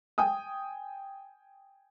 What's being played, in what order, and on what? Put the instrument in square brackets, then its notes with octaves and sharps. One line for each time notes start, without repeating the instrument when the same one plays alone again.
[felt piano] G5 G#5 D#6